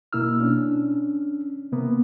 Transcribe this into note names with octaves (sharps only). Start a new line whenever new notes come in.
B2 A#3 E4 E6 F6
C#4 D4
C3 A#3 B3